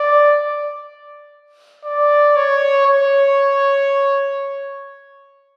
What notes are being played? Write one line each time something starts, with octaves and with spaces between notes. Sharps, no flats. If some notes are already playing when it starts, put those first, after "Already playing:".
Already playing: D5
D5
C#5
C#5